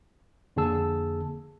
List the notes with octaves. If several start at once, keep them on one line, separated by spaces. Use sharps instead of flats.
F2 D3 A#3 G#4 A5 E6